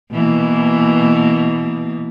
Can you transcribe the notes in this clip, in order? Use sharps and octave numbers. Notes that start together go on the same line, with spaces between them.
B2 E3 A#3